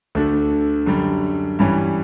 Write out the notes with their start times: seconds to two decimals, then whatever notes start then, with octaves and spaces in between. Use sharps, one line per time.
0.15 D2 D3 A3 D4
0.86 F#2 D3 G3
1.59 G2 E3 G3 C#4